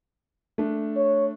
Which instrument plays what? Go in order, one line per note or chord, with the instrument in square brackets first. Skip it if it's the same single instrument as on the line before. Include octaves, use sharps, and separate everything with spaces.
[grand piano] A3 D4
[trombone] C#5